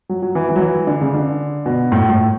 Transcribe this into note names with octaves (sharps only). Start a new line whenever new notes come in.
F#3
F#3
E3
E3
F#3
E3
D3
C#3
D3
B2
A2
A2